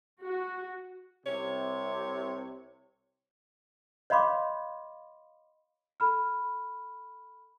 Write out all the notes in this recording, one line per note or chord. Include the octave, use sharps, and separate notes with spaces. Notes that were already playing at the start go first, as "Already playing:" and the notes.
F#4
C2 C3 C#5
C#5 D#5 F5 B5 C6 D6
A4 B5 F6